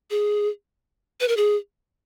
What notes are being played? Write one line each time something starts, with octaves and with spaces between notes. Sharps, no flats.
G#4
B4
A#4
G#4